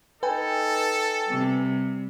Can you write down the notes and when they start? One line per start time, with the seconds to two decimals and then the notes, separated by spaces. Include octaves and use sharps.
0.23 D#4 A4 B4 G5 G#5
1.27 C3 G3